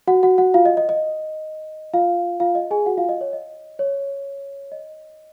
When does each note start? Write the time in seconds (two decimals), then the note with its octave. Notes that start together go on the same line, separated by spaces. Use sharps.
0.08 F#4 F#5
0.23 F#4 F#5
0.38 F#4 F#5
0.54 F4 F5
0.65 D#5
0.77 D#5
0.89 D#5
1.94 F4 F5
2.40 F4 F5
2.55 D#5
2.71 G#4 G#5
2.86 F#4 F#5
2.98 F4 F5
3.09 D#5
3.21 C#5
3.33 D#5
3.79 C#5
4.72 D#5